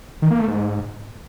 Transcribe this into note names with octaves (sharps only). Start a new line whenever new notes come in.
D#3
A#3
A3
G#2